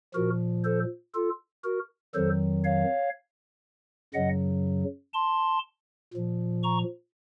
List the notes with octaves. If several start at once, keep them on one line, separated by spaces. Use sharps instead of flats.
A#2 F3 F#4 A#4
A4 C5
F4 A4
F#4 A#4
F2 D#3 F#3 A4 C5
C#5 F5
F#2 C#3 F#3 D#5 F#5
A5 C6
A#2 F3
A#5 C#6